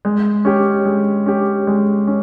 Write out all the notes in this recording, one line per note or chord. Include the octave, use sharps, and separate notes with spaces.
G#3
C#4 G4
G#3
C#4 G4
G#3
C#4